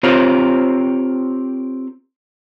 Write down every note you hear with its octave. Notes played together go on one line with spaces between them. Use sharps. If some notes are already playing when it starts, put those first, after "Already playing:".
C4 F4 G4 A#4 C5 C#5